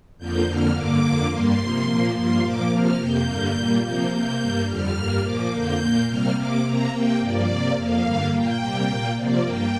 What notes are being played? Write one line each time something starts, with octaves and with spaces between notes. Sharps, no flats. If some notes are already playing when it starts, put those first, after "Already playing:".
F2 D3 F3 A#3 G6
F2 D3 A#3 F6
G2 D3 A#3 D6
F2 D3 A#3
G2 G3 A#3 C6
C3 F3 A#3
A#2 F3 A#3
G2 F3 A#3 C6
A#2 F3 A#3 D6
C3 F3 A#3 F6
F2 C3 A#3 G6
G2 D3 G3 A#3
A#2 G3 A#3
C3 F3 A#3 G6
C3 A#3 G6
G2 G3 A#3
F2 D3 G3 F6
G2 G3 A#3
A#2 F3 A#3 D6
F2 D3 A#3 G6
A#2 A#3
C3 G3 A#3 F6
C3 A#3 D6
C3 A#3 A#5
C3 A#3 G5
G2 F3 A#3 D5
C3 A#3
F2 F3 A#3 F5
G2 D3 G3 A#3
A#2 A#3 G5
C3 G3 A#3
A#2 A#3
C3 F3 A#3 D5
G2 G3 A#3 G5